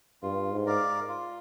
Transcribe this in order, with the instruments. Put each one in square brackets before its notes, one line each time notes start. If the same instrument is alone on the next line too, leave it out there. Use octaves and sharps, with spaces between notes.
[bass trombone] G2 [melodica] F4
[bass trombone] G#2
[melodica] A#4 D5 F5
F4